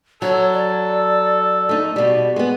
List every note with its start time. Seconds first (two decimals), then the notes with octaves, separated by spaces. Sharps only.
0.22 F#3 A4 C#5
0.52 D5
1.69 A3 D#4
1.96 B2 G3
2.36 G#3 B3